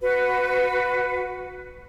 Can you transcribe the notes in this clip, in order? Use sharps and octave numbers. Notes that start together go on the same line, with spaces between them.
F#4 B4